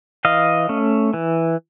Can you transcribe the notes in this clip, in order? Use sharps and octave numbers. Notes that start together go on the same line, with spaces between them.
E3 D#5 F5
A3 C#4
E3